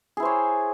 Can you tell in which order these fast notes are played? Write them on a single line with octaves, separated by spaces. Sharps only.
G#4 E4 C5 C#5